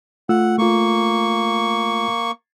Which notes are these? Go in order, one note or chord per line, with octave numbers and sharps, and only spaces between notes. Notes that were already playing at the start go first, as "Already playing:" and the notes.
A3 F4 F#5 E6
A3 A#3 F4 C#6